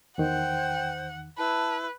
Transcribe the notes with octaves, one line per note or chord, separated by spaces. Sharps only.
E2 D#3 C5 F#5 G5
E4 B4 A5